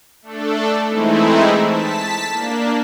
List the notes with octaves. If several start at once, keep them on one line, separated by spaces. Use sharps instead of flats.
A3 D4 A4
E3 G#3 A3 C4 D#4 E4
A5 B6
A#3 D4